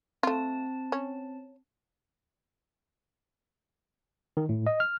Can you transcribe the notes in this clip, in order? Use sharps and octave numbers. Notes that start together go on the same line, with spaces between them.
A3 C4 F4 A5
C#4
D#3
A2
D#5
F6